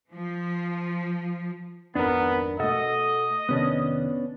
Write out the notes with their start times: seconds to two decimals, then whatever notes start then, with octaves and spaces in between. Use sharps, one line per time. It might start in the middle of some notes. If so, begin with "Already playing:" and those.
0.13 F3
1.95 G#1 F2 A#3 B3 D4 A#4
2.60 B2 A3 A4 D#5 F#5
3.49 F1 C3 D#3 B3 C#4 D4